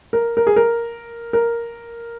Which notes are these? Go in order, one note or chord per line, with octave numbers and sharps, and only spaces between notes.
A#4
A#4
G#4
A#4
A#4